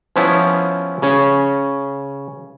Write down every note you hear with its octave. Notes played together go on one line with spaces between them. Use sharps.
F3 B3 C#4 E4
C#3 C#4